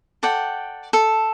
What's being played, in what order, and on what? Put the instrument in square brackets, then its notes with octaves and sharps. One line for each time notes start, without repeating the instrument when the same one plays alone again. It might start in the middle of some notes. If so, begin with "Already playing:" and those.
[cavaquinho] A4 D5 F#5 G5
A4